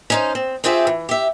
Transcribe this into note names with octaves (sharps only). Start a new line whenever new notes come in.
C#4 D#4 C5
C4
C4 F4 G4 G#4 E5
E3
G4 E5